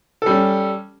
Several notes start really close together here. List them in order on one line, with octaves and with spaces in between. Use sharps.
A4 G3 C#4